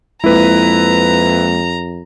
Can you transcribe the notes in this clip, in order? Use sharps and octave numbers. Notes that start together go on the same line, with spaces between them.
F2 G#3 A#3 E4 B4 A#5